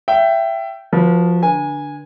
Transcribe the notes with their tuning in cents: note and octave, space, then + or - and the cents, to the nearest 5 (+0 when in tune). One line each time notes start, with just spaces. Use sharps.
E5 +20 G5 -10
F3 +0 F#4 +0 B4 -35
D3 +0 B4 -45 G#5 -10